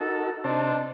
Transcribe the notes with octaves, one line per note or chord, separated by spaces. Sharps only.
D#4 F#4 A4 A#4 A5
C3 D4 D#4 C5 A5